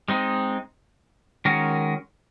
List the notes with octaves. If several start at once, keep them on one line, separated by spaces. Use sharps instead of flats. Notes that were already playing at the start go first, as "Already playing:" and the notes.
G#3 C4 D#4
D#3 G#3 C#4 F#4 A#4